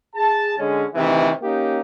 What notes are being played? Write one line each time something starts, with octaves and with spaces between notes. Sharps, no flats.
G#4 A5
D3 G#3 C#4
D2 C3 D#3 E3
A#3 C#4 D#4 G4